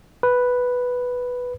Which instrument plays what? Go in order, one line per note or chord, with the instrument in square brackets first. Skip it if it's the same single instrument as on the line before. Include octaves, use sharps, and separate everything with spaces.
[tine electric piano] B4